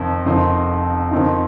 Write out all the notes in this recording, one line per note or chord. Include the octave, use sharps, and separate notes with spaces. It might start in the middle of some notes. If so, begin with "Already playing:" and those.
Already playing: F2 C3 D#3 C4 D#4
F1 F2 D#3 C4 D#4
F2 D#3 C4 D#4